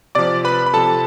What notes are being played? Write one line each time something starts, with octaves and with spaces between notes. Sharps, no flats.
C3 F3 D5 D6
B4 B5
B5
C3 F3 A4 A5